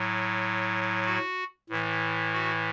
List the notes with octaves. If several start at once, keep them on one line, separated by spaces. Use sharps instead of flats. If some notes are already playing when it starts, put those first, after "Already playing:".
Already playing: A2 F#3
F#4
A2 E3
F#4